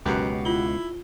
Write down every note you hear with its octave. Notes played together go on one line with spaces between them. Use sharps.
C#2 F#2 B2 B3 F#4 G4
E4 F4 G7